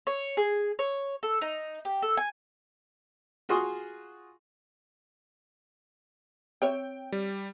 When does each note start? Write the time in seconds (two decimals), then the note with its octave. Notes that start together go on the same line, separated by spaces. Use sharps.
0.07 C#5
0.37 G#4
0.79 C#5
1.23 A4
1.42 D#4
1.85 G4
2.02 A4
2.17 G#5
3.49 F4 F#4 G#4 C6 C#6 D#6
6.62 C4 C#5 E5 G5
7.12 G3